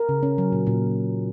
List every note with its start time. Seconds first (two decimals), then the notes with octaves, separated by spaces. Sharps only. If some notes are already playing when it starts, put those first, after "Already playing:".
Already playing: A#4
0.09 C#3
0.23 C#4
0.38 F#3
0.52 A#2
0.67 A#2